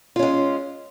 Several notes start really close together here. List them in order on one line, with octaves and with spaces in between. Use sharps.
F4 C#4 G#3